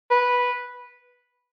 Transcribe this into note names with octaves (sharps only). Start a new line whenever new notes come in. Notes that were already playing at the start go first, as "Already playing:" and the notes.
B4